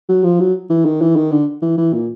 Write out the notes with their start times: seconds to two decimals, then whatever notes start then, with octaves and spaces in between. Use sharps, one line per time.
0.09 F#3
0.24 F3
0.40 F#3
0.70 E3
0.85 D#3
1.01 E3
1.16 D#3
1.32 D3
1.62 E3
1.78 E3
1.93 A#2